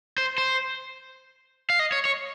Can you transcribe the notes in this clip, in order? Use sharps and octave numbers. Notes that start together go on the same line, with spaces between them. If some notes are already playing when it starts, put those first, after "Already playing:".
C5
C5
F5
D#5
C#5
C#5